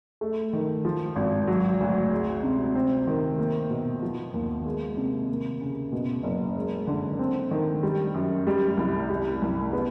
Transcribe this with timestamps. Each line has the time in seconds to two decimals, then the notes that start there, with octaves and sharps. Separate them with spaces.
0.21 A3
0.53 D#3
0.85 F3
1.16 G#1
1.47 F#3
1.80 D2
2.11 G#3
2.43 C3
2.75 C4
3.07 D#3
3.38 A#3
3.70 B2
4.02 F3
4.34 D#2
4.65 G#3
4.97 C3
5.29 A#3
5.61 C#3
5.92 B2
6.23 F#1
6.56 G#3
6.87 D3
7.19 C4
7.51 D#3
7.83 G3
8.14 F#2
8.47 G3
8.77 C2
9.10 G3
9.42 C2
9.73 B3